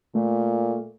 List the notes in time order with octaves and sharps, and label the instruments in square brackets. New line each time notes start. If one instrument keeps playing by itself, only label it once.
[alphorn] A#2 [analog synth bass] A3